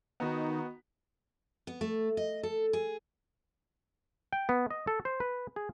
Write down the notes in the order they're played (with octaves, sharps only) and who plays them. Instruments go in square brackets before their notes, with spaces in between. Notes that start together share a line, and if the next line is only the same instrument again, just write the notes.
[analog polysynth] D#3 D#4 [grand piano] B3 F#4
[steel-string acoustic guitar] B3
A3
D#5
A4
G#4
[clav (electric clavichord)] G5
B3
D#5
A4
C5
B4
G#4